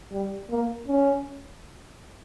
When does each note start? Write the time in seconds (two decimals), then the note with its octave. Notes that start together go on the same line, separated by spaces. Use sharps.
0.12 G3
0.50 A#3
0.88 C#4